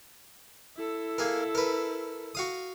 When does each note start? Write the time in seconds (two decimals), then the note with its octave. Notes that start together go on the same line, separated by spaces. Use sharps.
0.76 E4 A4
1.18 A#3 G#4 A#4
1.55 A#4 B4
2.35 F#4 F5 D#6